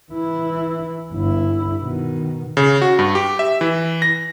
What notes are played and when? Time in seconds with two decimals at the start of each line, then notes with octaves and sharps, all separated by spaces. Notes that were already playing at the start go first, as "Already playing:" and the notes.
0.12 E3 E4
1.12 G1 E4
1.81 B2 D#3
2.57 C#3
2.82 F#4
2.99 G2
3.15 G4
3.39 E5
3.61 E3
4.02 A#6